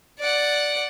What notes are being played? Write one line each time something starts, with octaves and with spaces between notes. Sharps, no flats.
D5 F#5